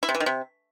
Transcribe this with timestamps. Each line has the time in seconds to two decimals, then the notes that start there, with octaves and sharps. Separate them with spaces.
0.03 E4
0.09 C3
0.15 E3
0.20 D#3
0.26 C3